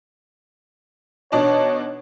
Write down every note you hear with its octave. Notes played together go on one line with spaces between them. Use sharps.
B2 D4 D#4 C#5